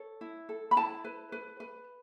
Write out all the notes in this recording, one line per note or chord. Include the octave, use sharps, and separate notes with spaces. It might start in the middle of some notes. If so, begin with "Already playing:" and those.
Already playing: A4 C#5
E4
A4
B5
E4 A5
B4
B4
B4